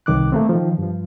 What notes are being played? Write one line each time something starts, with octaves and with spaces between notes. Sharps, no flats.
C2 D#3 D6 F#6
A3 A#3 C4
D#3 F3
G2 F3